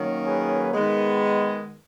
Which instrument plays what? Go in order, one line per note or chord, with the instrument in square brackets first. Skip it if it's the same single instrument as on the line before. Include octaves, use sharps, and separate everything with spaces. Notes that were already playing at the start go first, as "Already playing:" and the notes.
Already playing: [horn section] D#3 F#3 A#3 C#4
G#4 B4
D#3 G#3 B3